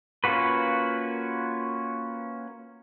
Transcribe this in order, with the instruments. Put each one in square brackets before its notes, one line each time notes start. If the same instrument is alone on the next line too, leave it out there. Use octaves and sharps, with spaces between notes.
[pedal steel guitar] A#3 C#4 F4 F#4 B4